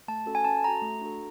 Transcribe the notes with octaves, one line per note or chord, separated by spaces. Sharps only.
A3 A5
C#4 F#4 A4
G#5
C#4 A5
F#4 A4 A#5
A3
D4 F#4 A4